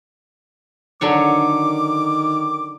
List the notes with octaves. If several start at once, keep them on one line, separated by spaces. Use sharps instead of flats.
D3 D#3 F#3 C#5 D6